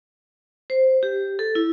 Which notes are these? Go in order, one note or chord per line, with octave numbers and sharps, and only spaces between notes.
C5
G4
A4
E4